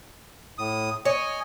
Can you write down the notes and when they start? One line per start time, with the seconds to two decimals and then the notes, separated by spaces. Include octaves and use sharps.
0.58 A2 D#6
1.05 C#5 D#5 G#5